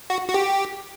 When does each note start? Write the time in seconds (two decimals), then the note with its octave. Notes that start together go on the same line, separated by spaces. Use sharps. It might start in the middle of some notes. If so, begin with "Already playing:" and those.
0.10 F#4
0.29 F#4
0.34 G4